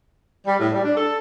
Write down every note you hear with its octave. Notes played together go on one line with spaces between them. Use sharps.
G3
A2
G3
D4
A4